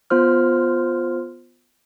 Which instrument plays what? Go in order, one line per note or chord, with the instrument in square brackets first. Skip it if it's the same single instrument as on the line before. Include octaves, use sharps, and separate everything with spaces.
[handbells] B3 F4 C5 F6